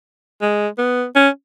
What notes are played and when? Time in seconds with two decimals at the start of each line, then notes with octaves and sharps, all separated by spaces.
0.42 G#3
0.78 B3
1.16 C#4